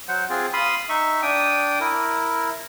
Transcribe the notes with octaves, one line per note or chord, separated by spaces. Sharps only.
F#3 C5 F#5
C4 F4 G#4
F5 B5 C6 D#6
D#4 E5 C#6
D4 G5 D#6
E4 A#4